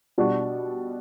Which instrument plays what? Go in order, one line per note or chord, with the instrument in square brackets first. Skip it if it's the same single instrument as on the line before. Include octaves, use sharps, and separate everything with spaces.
[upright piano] B2 G3 D4 F#4